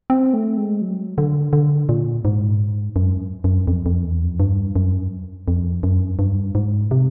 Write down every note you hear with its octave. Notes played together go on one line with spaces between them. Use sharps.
C4
A3
G#3
F#3
D3
D3
A#2
G#2
F#2
F#2
F2
F2
E2
F2
G2
F#2
F2
F#2
G2
G#2
C3